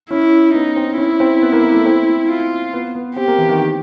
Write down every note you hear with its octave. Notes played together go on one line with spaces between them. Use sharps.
C#4 E4
B3 D#4
C4
C#4 E4
C4
B3
A#3
A#3
A3
C4
F4
B3
B3
C4 G4
A#3
E3
D#3